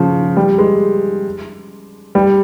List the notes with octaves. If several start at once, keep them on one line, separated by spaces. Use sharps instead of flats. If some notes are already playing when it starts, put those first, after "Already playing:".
Already playing: C#3 F3
G3
G#3
G3